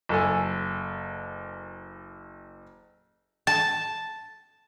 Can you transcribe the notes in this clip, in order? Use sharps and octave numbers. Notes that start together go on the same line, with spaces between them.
F#1 A4 G#5
A5